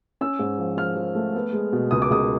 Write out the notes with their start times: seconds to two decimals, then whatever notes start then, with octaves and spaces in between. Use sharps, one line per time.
0.21 C#4 E6
0.39 G#2
0.59 F3
0.77 F3 F6
0.96 F3
1.15 A3
1.35 B3
1.53 G#3
1.73 B2
1.91 C#2 D#6
2.02 D6
2.10 C#2 D#6